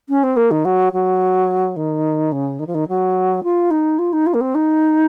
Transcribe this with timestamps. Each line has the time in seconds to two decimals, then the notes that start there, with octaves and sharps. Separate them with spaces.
0.09 C#4
0.23 C4
0.36 A#3
0.51 D#3
0.65 F#3
0.92 F#3
1.76 D#3
2.32 C#3
2.59 D#3
2.67 F3
2.74 D#3
2.88 F#3
3.43 F4
3.70 D#4
3.98 F4
4.13 D#4
4.26 F4
4.34 A#3
4.41 C4
4.54 D#4